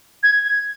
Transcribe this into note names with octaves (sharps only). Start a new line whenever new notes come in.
G#6